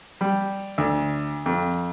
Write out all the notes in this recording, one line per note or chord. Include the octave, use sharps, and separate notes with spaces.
G3
D2
F2